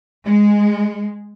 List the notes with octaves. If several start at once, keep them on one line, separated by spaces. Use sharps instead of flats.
G#3